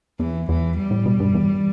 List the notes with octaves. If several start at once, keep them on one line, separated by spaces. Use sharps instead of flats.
E2 E3
E2 E3
G3
A2
B2
G2
E2